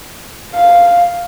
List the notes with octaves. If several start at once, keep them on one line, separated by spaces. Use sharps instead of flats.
F5